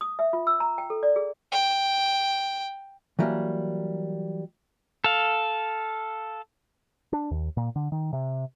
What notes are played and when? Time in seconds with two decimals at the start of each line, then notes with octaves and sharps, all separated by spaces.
0.01 D#6
0.19 E5
0.33 F4
0.47 E6
0.60 A#5
0.78 G5
0.90 A4
1.03 D5
1.16 G#4
1.52 G5
3.19 E3 F#3 G3 A#3
5.04 A4 F5
7.13 D4
7.31 D#2
7.57 A#2
7.76 D3
7.92 D#3
8.13 C3